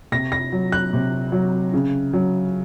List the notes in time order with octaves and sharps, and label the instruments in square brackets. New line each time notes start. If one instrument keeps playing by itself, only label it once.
[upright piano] C3 A#6
A#6
F#3
F#6
C3
F#3
C#3
F#3